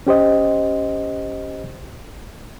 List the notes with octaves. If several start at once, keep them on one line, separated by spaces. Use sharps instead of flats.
C#4 G4 C5 D#5